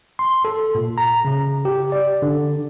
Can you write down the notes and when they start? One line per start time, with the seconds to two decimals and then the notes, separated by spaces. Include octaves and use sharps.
0.19 C6
0.45 A4
0.75 A#2
0.98 A#5
1.25 C#3
1.65 G4
1.92 D5
2.22 D3